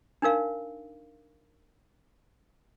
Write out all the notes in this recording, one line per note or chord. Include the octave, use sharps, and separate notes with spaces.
D4 D#4 A#4 F5